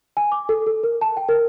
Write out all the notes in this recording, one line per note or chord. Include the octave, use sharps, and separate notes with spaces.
G#5
D6
A4
A4
A#4
A5
G5
A#4